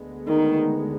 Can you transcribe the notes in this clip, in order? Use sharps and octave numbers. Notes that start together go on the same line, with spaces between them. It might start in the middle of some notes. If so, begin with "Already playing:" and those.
Already playing: D2 D3 G#3 B3
D#3